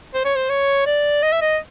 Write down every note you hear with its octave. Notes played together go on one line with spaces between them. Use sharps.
C5
C#5
C5
C#5
D5
D#5
E5
D#5